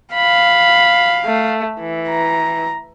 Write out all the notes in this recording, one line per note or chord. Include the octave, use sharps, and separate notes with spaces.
F5 B5
A3
E3
A#5